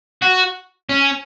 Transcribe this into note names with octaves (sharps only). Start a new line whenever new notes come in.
F#4
C#4